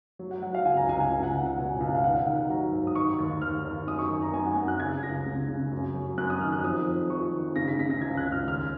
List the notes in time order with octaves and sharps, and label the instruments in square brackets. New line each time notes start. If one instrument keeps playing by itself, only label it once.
[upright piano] F#3
F#5
F#3 F#5
F5
C#2 G#5
A#5
C#2 G#5
G#5
C#2 G#5
F#5
C#2
F#5
B2 G#5
C#2
F5
D#3 F#5
F5
D#3 F#5
F#5
F#3 A#5
G#2
D#6
D#3 C#6
D#2
D#2 F6
D#2
F#2 D#6
C#6
D#3
A#5
F#2 G#5
F#5
F#2 G#5
F#6
C#3 G#6
C#2 A#6
C#3
C#3
F#2
F#3
F#2 F#6
D#6
D#3 F6
F#6
F2 D#6
F2
F2 C#6
D#3
C#3 A#6
B6
C#3 B6
A#6
C#2 G#6
F#6
C#2
F6
D#2 F6